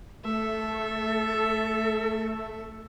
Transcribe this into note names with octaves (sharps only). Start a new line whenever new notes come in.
A3 A4 E5